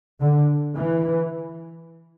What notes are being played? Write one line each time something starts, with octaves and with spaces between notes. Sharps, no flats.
D3
E3